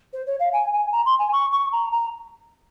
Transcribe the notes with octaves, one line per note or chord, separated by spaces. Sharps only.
C5
C#5
F5
G#5
G#5
A#5
C6
G#5
C#6
C#6
A#5
A#5